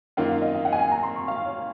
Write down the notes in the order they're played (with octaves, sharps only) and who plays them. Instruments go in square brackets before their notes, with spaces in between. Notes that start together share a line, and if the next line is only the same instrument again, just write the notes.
[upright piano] F#2 D#3 A#3 F4 [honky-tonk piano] F#5
[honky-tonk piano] F5
D#5
F5
F#5
G#5
A#5
C6
C#6
F5
C#5